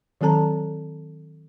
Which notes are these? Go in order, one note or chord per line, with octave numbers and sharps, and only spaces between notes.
D#3 F#3 C4 A4 A5 A#5